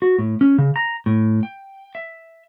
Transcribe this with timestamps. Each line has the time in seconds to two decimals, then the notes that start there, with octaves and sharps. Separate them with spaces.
0.02 F#4
0.19 A2
0.41 C#4
0.58 C#3
0.76 A#5
1.06 A2
1.43 G5
1.95 E5